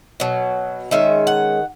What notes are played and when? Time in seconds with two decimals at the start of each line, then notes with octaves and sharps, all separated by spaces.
0.20 B2 F#3
0.91 D#3 G#3 C#4 E5
1.27 F#5